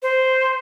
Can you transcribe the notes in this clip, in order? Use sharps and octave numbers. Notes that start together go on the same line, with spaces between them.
C5